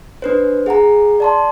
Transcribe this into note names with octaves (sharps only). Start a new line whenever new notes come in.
D4 B4 C5
G#4 F#5 G#5 A#5
D5 A5 C6